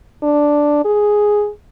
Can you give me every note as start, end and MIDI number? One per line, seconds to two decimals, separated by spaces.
0.23 0.80 62
0.85 1.50 68